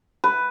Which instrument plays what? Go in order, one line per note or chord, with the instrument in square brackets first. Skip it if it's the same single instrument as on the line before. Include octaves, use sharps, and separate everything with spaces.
[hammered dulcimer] B4